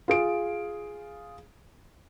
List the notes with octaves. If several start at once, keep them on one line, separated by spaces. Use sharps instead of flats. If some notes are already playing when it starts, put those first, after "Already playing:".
F4 G#4 D7